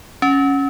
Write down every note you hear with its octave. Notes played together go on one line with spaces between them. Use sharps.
C#4